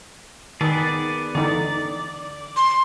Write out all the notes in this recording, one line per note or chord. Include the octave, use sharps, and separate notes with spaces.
D#3 B3 G#4 D5
D3 E3 D#4 D5
C6